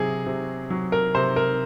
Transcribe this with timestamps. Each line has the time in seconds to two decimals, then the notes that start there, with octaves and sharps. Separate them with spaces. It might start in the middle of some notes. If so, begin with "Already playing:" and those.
Already playing: C3 F#3 G#4
0.26 C3
0.70 F#3
0.92 A#4
1.15 C3 C5
1.36 A#4